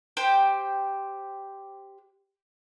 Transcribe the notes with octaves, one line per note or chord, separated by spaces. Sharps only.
G4 C5 G5